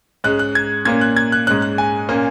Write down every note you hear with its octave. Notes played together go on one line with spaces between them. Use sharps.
G#2 G#3 C#4 F#6
F#6
G#6
A#2 A#3 C#4 G#6
F#6
G#6
F#6
G#2 G#3 C#4 F#6
F#6
G#5
A#2 A#3 C#4